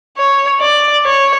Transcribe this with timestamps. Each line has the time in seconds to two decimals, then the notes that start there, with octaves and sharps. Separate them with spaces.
0.17 C#5
0.61 D5
1.04 C#5